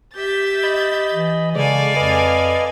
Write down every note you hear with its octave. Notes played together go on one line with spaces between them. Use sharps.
G4 E5 G6 A6
D#5 B5
E3
C#3 G#3 A4 D5 F5 G#5
F2 B4 D#5